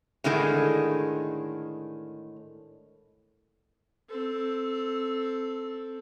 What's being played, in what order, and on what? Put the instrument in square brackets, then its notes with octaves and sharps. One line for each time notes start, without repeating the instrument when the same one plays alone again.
[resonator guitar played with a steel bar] A2 D3 D#3 G#3
[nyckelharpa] C4 A4